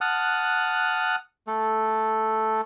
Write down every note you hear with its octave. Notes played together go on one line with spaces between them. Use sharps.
F#5 A5 D#6 F6 F#6
A3 A4